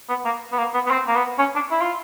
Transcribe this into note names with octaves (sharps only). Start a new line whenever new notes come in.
B3
A#3
B3
A#3
B3
B3
C4
A#3
B3
C#4
D4
E4
F4